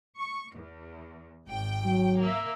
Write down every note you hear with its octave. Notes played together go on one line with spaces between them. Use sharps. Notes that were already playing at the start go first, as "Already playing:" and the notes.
C#6
E2
G#1 G5
F#3
A#3 E5